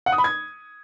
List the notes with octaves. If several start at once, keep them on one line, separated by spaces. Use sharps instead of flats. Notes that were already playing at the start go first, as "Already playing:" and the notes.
F#5
D#6
B5
G#6